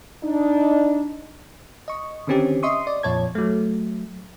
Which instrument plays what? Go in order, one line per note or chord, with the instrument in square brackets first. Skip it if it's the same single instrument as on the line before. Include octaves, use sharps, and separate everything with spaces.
[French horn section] D4 D#4
[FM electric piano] D#5 C#6
D3 D#3 C4 C#4 G4
D#5 E5 C6 C#6 D#6
D5
F2 A#2 C#5 A5 G#6
F#3 A3